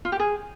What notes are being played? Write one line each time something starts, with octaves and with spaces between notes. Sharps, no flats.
F4
G4
G#4